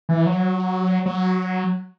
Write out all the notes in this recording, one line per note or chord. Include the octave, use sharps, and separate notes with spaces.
E3
F#3
F#3